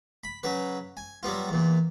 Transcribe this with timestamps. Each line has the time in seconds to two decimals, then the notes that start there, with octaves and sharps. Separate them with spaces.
0.24 B5
0.43 C#3 F#3 B4
0.97 G#5
1.23 F#3 G3 B3 F4
1.49 E2 A#2